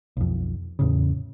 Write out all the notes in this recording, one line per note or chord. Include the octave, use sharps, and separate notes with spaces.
B1 F2
E2 A2 C#3